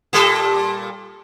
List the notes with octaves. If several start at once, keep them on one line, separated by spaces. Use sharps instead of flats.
A#2 G3 A4